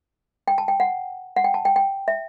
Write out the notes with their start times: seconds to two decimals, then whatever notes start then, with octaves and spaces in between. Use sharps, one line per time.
0.48 G5
0.58 A5
0.68 G5
0.80 F#5
1.36 F#5
1.44 G5
1.54 A5
1.65 G5
1.76 G5
2.08 E5